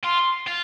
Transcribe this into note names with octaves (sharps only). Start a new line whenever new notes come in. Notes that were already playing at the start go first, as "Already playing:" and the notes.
F4 C6
F4